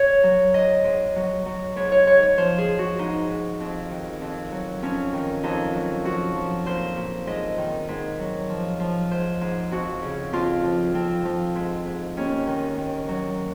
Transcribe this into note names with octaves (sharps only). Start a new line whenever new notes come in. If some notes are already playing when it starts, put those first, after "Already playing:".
Already playing: C#5
F#3
G#2 D#5
G#2
F#3
F#3
G#2 C#5
C#5
G#2 C#5
C#5
F3 C5
G#4
F3
F#4
G#2 D#4
G#2
F2
D#3
F2
F#3
F2 C#4
D#3
F2 D#4
F#3
F3 F#4
F3
A#2 C5
A#2
G#2 D#5
D#3
G#2
F#3
F3
F3
G#2 C5
G#2
F2 F#4
C#3
F2 F4
F3
F3 C4
F3
G#2
G#2
D#2 C#4
D#3
D#2
F#3